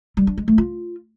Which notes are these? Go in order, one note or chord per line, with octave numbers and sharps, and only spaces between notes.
G3
D4
G#3
A3
F4